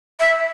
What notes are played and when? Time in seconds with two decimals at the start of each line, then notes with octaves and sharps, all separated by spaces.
0.20 E5